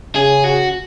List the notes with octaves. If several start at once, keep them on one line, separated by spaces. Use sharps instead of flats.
C#3 G#4
F#4